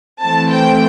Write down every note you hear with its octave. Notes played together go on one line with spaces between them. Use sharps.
E3 A3 C4 A5
G5